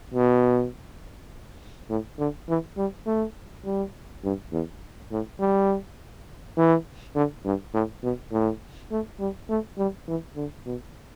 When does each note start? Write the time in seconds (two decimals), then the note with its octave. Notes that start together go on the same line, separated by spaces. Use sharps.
0.14 B2
1.89 A2
2.19 D3
2.48 E3
2.77 G3
3.06 A3
3.65 G3
4.23 G2
4.52 E2
5.11 A2
5.40 G3
6.57 E3
7.15 D3
7.45 G2
7.74 A2
8.03 B2
8.32 A2
8.91 A3
9.20 G3
9.49 A3
9.78 G3
10.08 E3
10.36 D3
10.66 B2